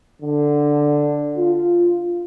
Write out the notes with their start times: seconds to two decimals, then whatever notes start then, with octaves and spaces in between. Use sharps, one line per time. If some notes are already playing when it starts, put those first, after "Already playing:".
0.22 D3
1.37 F4